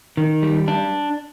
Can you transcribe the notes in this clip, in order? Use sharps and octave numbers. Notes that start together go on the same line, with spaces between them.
D#3
G3
D4